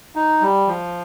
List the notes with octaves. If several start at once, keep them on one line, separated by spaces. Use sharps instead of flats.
D#4
G3
F3